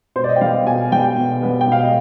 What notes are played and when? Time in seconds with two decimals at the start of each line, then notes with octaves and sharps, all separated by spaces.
0.16 B2 C5
0.24 D5
0.29 D#5
0.36 G5
0.41 G3 B3 F5
0.67 B2 G#5
0.92 G3 B3 G5
1.18 B2
1.43 G3 B3
1.61 G5
1.68 B2 F5
1.83 D#5